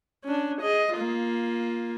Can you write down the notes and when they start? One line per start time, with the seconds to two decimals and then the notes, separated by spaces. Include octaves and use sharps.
0.24 C#4 D4
0.61 G#4 D#5
0.94 A#3 F4